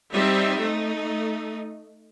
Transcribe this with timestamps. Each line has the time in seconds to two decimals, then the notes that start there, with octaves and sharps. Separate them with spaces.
0.12 G3 C4 D#4 E5
0.59 A3 D#4